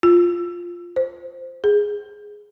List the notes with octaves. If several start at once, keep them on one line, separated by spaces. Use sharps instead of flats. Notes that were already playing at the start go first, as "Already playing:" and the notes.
F4
C5
G#4